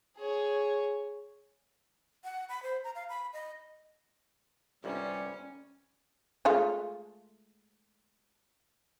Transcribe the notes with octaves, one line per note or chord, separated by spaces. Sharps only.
G#4 C#5
F#5
B5
C5
A#5
F5
B5
D#5
G1 C2 G#2 G3 C#4
G#3 A3 F4